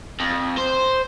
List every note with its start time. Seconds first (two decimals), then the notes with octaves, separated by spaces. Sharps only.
0.20 F2
0.57 C5